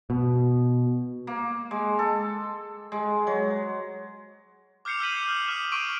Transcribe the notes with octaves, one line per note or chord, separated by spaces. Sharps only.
B2
A#3
G#3
A4
G#3
F#3
D6 F6 G6 C7 C#7 F7
E6 G6 B6 D#7 F#7
F6 G6
D#6 F6
D6 F6 E7
C#6 D6 E6 D7 D#7